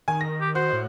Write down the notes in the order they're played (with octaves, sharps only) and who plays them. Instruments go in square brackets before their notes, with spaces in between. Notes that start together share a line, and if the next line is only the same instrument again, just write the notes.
[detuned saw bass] D#3 [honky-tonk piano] G#5
[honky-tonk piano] A#6
[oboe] G4
[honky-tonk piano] F#4 [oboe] C5
[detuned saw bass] A2